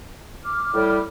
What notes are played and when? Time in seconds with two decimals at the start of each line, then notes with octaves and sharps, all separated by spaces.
0.43 D6 F6
0.74 A2 G3